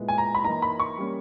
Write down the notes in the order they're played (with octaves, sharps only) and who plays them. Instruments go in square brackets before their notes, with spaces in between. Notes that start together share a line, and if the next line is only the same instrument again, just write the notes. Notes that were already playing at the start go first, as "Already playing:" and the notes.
Already playing: [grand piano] A#2 G#3 B3 E4
[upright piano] G#5
A#5
B5
[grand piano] E3 A#3 D#4 [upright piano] A#5
[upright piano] B5
C#6
[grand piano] G3 A#3 C#4